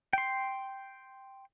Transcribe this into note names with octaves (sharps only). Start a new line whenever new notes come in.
G5 C6